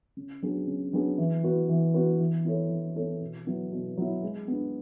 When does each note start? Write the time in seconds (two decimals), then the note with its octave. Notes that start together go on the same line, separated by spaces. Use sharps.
0.17 C#3
0.42 F#3 B3 D4 G#4
0.68 C#3
0.93 F#3 B3 D4 G#4
1.18 E3
1.44 B3 F#4 B4
1.69 E3
1.94 B3 F#4 B4
2.20 E3
2.45 B3 E4 A4 C#5
2.70 E3
2.96 B3 E4 A4 C#5
3.21 B2
3.47 F#3 B3 E4
3.72 B2
3.97 F#3 B3 E4
4.23 G#3
4.48 B3 D4